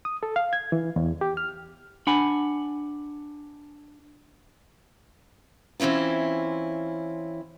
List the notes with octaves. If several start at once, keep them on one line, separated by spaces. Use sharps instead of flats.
D#6
A4
F5
G#6
E3
E2
G4
F6
D4 F#5 G#5 B5
E3 C4 C#4 E4 F4